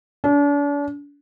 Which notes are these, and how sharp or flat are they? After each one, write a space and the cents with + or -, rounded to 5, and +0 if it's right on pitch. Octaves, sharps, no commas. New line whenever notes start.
D4 -40